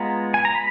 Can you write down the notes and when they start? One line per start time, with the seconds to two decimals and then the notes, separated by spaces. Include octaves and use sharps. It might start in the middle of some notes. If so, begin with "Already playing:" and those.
Already playing: G#3 B3 F4 A#5
0.34 G#5
0.45 A#5
0.55 B5